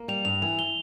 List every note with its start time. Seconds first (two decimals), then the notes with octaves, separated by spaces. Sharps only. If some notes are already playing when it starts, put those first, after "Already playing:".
Already playing: A#3
0.08 G3 F7
0.25 G2 F7
0.42 E3 F7
0.59 G7